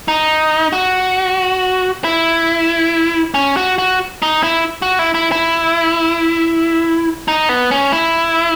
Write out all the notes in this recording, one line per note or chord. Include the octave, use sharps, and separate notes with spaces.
D#4
F#4
E4
C#4
F#4
F#4
D#4
E4
F#4
E4
E4
E4
D#4
B3
C#4
E4